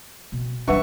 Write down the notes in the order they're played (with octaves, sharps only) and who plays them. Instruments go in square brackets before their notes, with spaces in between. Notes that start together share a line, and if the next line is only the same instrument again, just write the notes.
[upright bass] B2 C4
[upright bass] E3 G3 [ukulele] D4 B4 F#5 [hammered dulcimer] E5 C#6